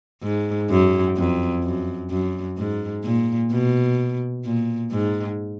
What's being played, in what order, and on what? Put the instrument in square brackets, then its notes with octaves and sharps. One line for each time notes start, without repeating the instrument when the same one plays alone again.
[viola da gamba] G#2
F#2
F2
F#2
F#2
G#2
A#2
B2
A#2
G#2